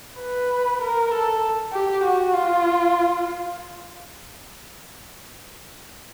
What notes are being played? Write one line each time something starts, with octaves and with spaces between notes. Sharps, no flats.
B4
A#4
A4
G4
F#4
F4